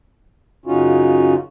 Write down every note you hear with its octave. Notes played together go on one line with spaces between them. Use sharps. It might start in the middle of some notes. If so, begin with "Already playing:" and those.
F#2 C#3 C#4 D#4 F4 F#4